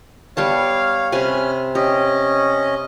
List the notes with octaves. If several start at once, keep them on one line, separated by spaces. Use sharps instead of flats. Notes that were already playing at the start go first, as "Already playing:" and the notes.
G3 B3 C#5 F5 A5
C3 C#4 B4 G#5 F6
C#4 G4 D#5